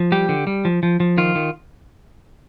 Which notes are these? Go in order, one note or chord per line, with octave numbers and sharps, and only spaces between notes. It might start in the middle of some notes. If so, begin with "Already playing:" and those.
Already playing: F3
G3 G4
D3
G3
F3
F3
F3
D#3 F4
D#3